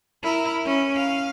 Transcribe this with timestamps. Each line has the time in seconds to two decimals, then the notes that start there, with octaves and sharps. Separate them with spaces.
0.23 E4 A#4
0.65 C#4
0.96 F5